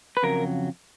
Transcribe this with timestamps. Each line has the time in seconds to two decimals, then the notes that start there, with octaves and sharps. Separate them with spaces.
0.17 B4
0.23 F2 C#3 F#3 A#4